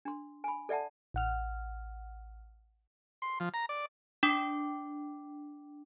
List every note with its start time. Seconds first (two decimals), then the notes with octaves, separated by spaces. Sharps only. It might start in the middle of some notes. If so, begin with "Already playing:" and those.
0.05 D4 C6
0.44 G#5 B5
0.69 A4 D5 E5 F#5 A5
1.14 A1 F#5 F6
3.22 C6
3.40 F3
3.54 A#5
3.69 D5
4.23 D4 G5 D6